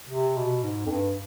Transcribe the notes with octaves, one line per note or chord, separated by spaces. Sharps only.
C3
B2
G#2
F2
G2